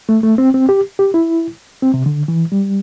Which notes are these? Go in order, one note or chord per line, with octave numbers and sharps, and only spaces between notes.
A3
A3
C4
C4
G4
G4
E4
C4
C3
D3
E3
G3